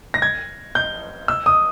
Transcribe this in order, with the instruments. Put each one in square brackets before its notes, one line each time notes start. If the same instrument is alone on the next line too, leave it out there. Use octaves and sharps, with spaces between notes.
[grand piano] A#6
G#6
G6
E6
D#6